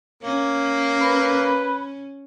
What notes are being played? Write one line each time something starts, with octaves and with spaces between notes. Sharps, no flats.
A#3 C#4
B4 B5